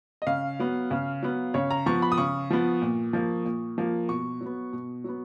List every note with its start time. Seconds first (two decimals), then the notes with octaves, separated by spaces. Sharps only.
0.22 D#5
0.27 C#3 F5
0.60 F#3 B3
0.91 C#3
1.23 F#3 B3
1.54 C#3 C#5
1.71 A#5
1.86 F3 B3 C#6
2.02 B5
2.12 D#6
2.18 C#3 C#6
2.50 F3 B3
2.82 A#2
3.13 F3 A#3
3.45 A#2
3.78 F3 A#3
4.09 B2 C#6
4.41 F#3
4.46 B3
4.73 B2
5.04 F#3 B3